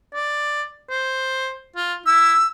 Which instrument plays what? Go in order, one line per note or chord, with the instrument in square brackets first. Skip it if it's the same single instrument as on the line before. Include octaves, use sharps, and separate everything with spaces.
[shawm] D5
C5
F4
[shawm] E4 [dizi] E6